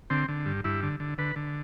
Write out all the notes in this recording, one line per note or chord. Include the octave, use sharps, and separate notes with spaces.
D3 C4
D3
G2
G2 E4
D3
D3
D3 B4
D3